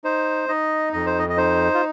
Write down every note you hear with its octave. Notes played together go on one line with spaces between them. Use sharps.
D#4 C5
D#4 D#5
F2 D#5
C5
D#5
D#5
D#4 C5
F4